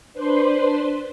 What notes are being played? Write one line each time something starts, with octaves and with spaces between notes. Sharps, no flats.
D4 B4 C5 C6